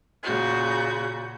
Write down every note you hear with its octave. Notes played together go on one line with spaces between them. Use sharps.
A#2 C#3 F#4 G6